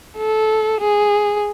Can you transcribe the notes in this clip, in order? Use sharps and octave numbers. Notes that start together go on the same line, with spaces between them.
A4
G#4